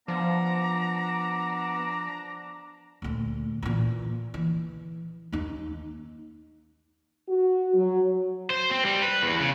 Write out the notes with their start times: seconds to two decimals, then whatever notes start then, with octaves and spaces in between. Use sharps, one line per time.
0.08 F3 B3 D4 A#5
3.02 D2 A#2
3.63 A#2 E3
4.34 E3
5.32 D#2 D#4
7.29 F#4
7.75 F#3
8.50 C5
8.71 C4
8.85 G3
9.02 B4
9.22 E2
9.40 C#3